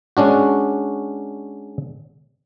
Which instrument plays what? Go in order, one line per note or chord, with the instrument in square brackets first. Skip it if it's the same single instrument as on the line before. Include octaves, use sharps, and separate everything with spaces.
[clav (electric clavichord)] G#3 C#4 D4 F#4